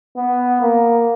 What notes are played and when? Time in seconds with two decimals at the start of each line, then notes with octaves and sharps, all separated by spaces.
0.16 B3
0.61 A#3